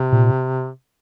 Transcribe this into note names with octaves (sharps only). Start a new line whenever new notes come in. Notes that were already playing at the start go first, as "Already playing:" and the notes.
Already playing: C3
A#2